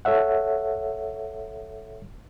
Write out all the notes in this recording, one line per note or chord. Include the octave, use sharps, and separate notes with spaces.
A4 C#5 E5 F#5